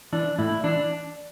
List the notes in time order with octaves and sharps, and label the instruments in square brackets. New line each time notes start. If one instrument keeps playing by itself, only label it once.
[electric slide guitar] E3 D4
A2 E4
E3 D4